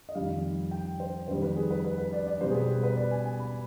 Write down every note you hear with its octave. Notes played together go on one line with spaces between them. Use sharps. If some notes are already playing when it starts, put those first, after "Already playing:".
D#5
F2 D#3 G3 F5
G5
C5
F2 D#3 G3 C5
B4
G#4
B4
B4
B4
D5
D5
B2 G3 C5
G#4
B4
G#4
B4
D5
G#5
G#5
B5